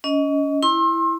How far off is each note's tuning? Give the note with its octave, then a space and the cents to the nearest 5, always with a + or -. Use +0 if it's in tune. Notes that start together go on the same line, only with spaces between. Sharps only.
C#4 +30 D#5 +10
E4 +0 C6 +35